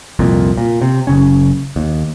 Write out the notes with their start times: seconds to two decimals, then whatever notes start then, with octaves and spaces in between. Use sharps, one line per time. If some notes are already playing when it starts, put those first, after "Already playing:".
0.19 C2 F2 A#2
0.57 A#2
0.82 C3
1.07 F#1 C#3 C#4
1.76 D#2